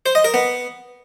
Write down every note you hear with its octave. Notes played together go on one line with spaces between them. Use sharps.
C5
D#5
A#4
B3